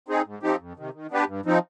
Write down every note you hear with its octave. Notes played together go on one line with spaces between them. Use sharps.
C4 D#4 G#4
G#2
F3 C4 D#4 G4
F2
C3 D#3
D#3
B3 D4 G4 B4
G2
F3 C4 D#4